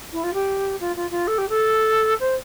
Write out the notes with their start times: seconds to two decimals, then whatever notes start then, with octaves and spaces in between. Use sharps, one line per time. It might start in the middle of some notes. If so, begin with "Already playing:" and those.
0.13 E4
0.23 F4
0.33 G4
0.80 F4
0.96 F4
1.11 F4
1.27 A4
1.38 G4
1.49 A4
2.20 C5